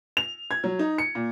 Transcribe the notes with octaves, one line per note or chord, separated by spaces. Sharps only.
F7
G#6
F#3
D#4
C#7
A#2